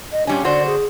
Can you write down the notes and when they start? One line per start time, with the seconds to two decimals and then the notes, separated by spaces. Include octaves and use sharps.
0.12 D#5
0.27 A#2 G3 C#4 D4
0.44 D3 F#4 C5 D5
0.66 G#4